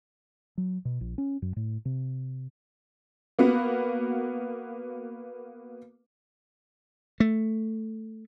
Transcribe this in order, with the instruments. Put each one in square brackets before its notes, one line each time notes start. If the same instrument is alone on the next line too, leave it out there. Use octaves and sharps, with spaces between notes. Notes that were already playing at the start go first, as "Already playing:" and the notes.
[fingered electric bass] F#3
B2
A#1
C#4
F#2
A2
C3
[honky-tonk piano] A#3 B3 F#4
[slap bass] A3